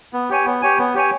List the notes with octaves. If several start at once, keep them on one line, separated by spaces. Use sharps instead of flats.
B3
G4 C#5 G#5
B3
G4 C#5 G#5
B3
G4 C#5 G#5